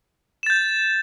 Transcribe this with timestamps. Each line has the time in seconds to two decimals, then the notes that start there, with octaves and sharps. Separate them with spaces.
0.43 E7
0.46 A6
0.50 G6